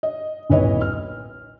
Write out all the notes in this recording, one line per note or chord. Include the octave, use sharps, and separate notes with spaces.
D#5
D#1 B1 E4 B4 C#5 D#5
F6